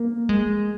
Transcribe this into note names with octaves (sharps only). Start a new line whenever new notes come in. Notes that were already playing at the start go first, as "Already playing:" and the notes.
Already playing: A#3
G#3